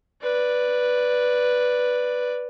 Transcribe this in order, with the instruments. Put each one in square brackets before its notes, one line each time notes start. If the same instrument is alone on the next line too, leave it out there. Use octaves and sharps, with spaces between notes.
[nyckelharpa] B4 D5